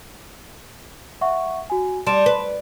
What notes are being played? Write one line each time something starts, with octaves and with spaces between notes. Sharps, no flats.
E5 F#5 C#6
F#4 G#5
G3 A5 C6 E7
B4